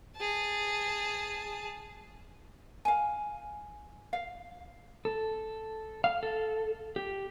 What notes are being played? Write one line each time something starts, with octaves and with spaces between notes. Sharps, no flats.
G#4 A5
F5 G#5
F5
A4
F5
A4
G4